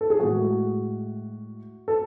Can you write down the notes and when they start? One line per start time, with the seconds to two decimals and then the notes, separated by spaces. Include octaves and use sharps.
0.01 A4
0.10 G#4
0.19 A2 G#3 F#4
1.88 A4